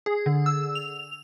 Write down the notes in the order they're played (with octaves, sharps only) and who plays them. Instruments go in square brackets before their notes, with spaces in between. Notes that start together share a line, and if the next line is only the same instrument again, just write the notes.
[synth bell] G#4
D3
E6
F7